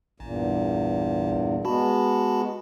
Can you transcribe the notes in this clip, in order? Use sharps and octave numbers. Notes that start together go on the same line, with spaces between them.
A1 E2 G2 A#2
G#3 B3 F#4 A5 B5